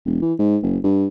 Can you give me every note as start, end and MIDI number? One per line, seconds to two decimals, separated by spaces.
0.06 0.21 28
0.22 0.34 52
0.39 0.58 44
0.63 0.78 30
0.84 1.07 43